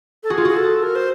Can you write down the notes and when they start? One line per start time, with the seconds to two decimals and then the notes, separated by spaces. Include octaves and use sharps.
0.24 A4
0.30 F#4 G#4
0.37 F4
0.45 F#4 G#4
0.57 A4
0.83 A#4
0.95 C5